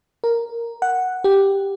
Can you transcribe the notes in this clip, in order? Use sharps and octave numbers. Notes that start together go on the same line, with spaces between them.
A#4
F#5
G4